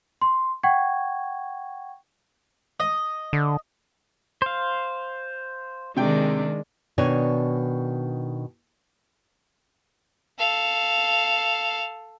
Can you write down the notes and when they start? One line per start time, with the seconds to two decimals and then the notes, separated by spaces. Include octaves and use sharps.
0.21 C6
0.63 F#5 G5 C#6 G#6
2.80 D#5
3.33 D3
4.42 C5 F5
5.97 C3 D#3 G#3 D4 G5
6.98 B2 D#3 D4 C#5 G#5
10.38 A4 F5